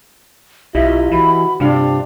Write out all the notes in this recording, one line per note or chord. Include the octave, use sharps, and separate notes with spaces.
B1 E4 F4 G4 D#5 E5
E3 F#4 B5
G2 C3 G3 D4 F4 F5